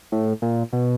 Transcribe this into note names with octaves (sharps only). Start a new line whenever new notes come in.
A2
A#2
B2